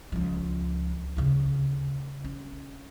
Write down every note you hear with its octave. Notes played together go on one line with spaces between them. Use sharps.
C#2 F3
D2 C#3
C#4